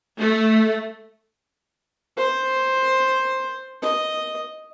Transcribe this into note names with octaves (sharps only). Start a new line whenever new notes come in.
A3
C5
D#5